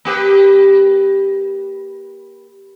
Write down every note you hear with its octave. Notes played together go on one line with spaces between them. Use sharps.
A#3 G4 B4